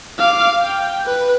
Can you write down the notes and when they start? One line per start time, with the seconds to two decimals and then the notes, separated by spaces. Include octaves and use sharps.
0.18 F5 D6
0.62 G5
1.05 B4